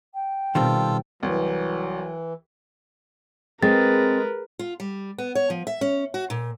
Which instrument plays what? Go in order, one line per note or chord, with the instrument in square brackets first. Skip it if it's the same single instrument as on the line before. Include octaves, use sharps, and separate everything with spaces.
[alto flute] G5
[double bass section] B2 [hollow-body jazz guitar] D#3 G3 C4 [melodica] F4 A4
[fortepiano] C2 [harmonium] E3 [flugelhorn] F#3
[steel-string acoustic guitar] G#3 [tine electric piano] C4 [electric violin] A#4 B4 [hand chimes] A6
[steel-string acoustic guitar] F4
G3
B3
C#5
F3
E5
C#4
F#4
A#2